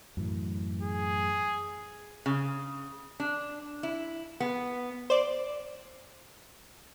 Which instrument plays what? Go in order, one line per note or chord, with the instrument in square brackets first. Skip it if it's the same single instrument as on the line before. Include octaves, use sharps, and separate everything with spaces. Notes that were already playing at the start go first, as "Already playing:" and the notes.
[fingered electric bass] F#2 A2 E3
[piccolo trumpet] G#4
[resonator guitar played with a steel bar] C#3
D4
E4
B3
[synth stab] C5 D5